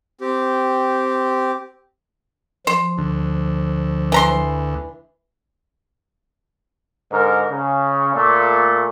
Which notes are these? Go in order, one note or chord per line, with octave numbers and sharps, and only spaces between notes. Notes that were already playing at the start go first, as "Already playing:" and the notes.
C4 G4
F3 C5
D2
E3 A#5 C6
G#2 D3 A#4
C#3
A#2 A3